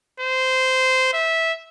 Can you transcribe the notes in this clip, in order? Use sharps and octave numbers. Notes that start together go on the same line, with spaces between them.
C5
E5